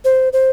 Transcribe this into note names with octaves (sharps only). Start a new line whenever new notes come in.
C5
C5